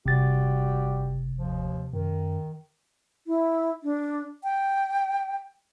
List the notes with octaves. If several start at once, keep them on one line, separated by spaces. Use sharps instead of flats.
F#1 C3 G3 F#4 G4 A6
D#2 F3
F#2 D#3
E4
D4
G5